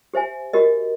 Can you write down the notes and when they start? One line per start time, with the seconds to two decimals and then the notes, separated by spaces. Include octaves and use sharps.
0.14 G4 C5 E5 G#5
0.53 F#4 G4 A#4 D#5